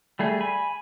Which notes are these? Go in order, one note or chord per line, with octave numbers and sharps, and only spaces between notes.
G3 A3 G#4
G#5 B5